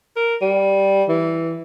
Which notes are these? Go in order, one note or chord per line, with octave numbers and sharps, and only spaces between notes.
A#4
G3
E3